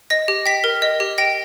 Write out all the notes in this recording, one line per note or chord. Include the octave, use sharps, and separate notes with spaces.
D#5 A#6
G4
G5 B6
A#4
D#5
G4
G5 A#6